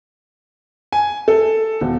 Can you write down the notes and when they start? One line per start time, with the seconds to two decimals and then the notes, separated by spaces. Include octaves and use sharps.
0.92 G#5
1.28 A4
1.81 E1